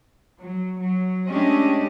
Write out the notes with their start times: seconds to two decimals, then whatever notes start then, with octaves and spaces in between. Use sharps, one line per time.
0.40 F#3
0.80 F#3
1.28 G#3 A3 C#4 D4 G4 D#5